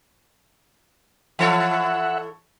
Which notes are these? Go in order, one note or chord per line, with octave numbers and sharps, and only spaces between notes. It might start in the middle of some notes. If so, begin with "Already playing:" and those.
E3 A4 C#5 E5 F#5